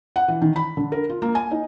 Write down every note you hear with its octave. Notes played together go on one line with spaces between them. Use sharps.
F#5
E3
D#3
B5
D3
A#4
F4
A#3
G#5
D#4